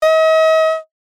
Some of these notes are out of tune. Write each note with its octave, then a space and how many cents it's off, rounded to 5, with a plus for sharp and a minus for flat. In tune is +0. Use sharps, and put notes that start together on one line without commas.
D#5 +45